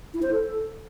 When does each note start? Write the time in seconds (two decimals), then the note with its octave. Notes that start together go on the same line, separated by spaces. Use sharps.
0.14 E4
0.23 C5
0.31 A4